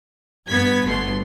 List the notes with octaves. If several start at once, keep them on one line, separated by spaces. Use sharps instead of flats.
G2 B3 G#6 B6
G1 B2 A3 C6